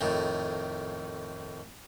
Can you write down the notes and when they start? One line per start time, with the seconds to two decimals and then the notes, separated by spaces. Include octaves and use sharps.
0.01 F2 A2 D#3